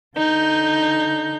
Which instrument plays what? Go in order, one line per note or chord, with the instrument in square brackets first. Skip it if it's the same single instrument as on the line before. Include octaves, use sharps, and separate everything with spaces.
[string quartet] D3 D#4 G6